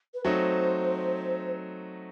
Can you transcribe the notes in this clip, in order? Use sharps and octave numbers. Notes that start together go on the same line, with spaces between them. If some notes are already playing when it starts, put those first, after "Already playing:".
B4
F#3 A3 C4 D#4 C5